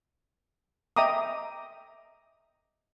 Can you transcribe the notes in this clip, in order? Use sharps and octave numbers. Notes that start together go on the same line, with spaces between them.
D#5 E5 G5 A#5 D6 D#6